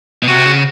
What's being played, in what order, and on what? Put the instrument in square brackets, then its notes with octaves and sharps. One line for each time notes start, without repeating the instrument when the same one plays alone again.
[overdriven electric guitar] B2
[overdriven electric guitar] C3 [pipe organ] F#4
[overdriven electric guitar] C#3